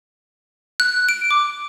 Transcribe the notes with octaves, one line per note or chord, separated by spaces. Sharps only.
F#6
D7
D6